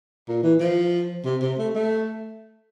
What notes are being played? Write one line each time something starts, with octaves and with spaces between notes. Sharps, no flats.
A#2
E3
F3
C3
C3
A3
A3